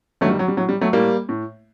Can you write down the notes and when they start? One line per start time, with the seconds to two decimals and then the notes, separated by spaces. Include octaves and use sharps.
0.21 G2 F#3 A3
0.25 D#3
0.30 G3
0.39 F#3
0.48 G3
0.57 A2 F#3
0.69 G3
0.81 F#3 A3
0.93 A2 G3 A#3
1.29 A2